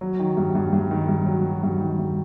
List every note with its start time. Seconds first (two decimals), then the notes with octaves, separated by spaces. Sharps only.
0.01 F#3
0.19 D#3
0.37 G2
0.55 G2
0.73 G2
0.91 D#3
1.08 G2
1.26 F#3
1.44 F#3
1.63 G2
1.81 D#3
1.99 G2